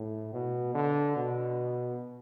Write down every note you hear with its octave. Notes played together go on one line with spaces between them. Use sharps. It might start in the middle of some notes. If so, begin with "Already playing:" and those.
Already playing: A2
B2
D3
B2